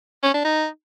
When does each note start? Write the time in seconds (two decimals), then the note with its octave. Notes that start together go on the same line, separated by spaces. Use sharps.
0.23 C#4
0.34 D4
0.45 D#4